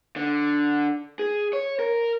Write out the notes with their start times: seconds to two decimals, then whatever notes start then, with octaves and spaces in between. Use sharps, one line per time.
0.16 D3
1.19 G#4
1.53 C#5
1.79 A#4